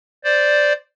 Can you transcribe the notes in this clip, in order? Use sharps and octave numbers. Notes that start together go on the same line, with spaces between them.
C5 D5